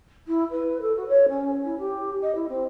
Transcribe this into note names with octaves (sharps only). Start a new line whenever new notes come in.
E4
B4
A4
F#4
C#5
C#4
E4
G4
D#5
E4
C4